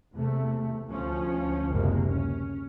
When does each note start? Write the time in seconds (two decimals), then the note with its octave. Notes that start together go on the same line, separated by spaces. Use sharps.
0.13 E2 C3 A3
0.89 D2 F3 C#4
1.71 F#1 D2 C3 G#3 A#3
2.07 C#4